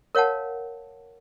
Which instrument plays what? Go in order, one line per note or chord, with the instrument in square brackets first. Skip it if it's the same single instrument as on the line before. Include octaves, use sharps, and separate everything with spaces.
[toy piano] A#4 C#5 F5 F#5 A5